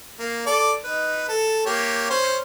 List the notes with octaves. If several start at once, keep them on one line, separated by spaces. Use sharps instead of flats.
A#3
A4 D5
D#4 B4
A4
A#3 G4 C#5
C#4 C5 C#5